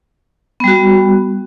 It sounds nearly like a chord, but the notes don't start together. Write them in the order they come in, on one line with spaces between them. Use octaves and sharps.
B3 G3 F#4